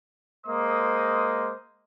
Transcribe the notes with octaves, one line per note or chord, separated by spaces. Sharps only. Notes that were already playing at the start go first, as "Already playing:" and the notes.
G#3 A#3 C5 D#5 C6 D#6